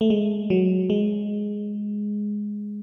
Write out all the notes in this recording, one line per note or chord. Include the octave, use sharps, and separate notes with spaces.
A3
G#3
F#3
G#3